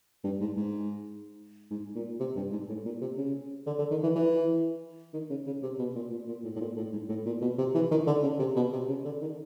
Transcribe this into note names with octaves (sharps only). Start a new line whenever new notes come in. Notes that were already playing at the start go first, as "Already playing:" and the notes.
G2
G#2
G#2
G#2
A#2
C3
G2
G#2
A2
A#2
C3
C#3
D3
D3
D#3
E3
E3
D#3
C#3
C#3
C3
B2
A#2
A#2
A#2
A2
A2
A#2
A2
G#2
A2
A#2
B2
C3
E3
D#3
D3
C#3
C3
B2
C3
C#3
D3
D#3